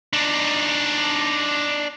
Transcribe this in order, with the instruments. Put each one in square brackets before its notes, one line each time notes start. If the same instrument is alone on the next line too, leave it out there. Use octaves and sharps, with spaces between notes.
[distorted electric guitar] D4 D#4